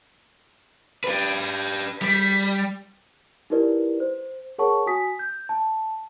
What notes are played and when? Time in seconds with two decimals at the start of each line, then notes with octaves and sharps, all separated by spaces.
1.04 G4 B4
2.02 G3 B6
3.50 D#4 E4 G4 A#4 B4 D5
4.00 C5
4.58 G#4 A#4 C#5 F#5 A5 C#6
4.86 F#4 G#5 D#6 B6
5.19 G6
5.49 A5